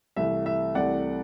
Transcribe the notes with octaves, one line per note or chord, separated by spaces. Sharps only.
C2 C3 E3 A3 E5
E5
C2 C3 E3 A3 D5 F#5